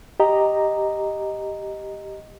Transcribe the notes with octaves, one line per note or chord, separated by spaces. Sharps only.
G4 D#5 A#5